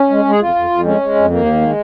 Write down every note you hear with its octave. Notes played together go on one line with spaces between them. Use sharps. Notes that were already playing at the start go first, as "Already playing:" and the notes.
Already playing: C#4
G#3
G#3
G#4
F2 F4
F2
F2
G#3 C#4
G#3
F2
D#2 A#3
D#3
G#3